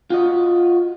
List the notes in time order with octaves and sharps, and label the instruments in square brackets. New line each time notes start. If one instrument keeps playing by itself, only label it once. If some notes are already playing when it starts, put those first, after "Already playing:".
[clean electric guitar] F4 F#4 D#5